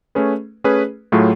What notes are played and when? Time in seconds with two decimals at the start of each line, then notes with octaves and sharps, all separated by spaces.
0.15 A3 C#4 G#4 B4
0.64 A3 C#4 G#4 B4
1.12 A2 F#3 A3 F4 G#4